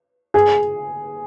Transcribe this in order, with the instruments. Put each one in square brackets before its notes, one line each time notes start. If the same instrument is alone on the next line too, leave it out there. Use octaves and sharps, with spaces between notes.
[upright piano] G#4